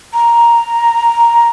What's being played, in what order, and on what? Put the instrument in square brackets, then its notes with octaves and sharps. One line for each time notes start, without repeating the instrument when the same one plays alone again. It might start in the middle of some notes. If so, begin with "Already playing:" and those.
[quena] A#5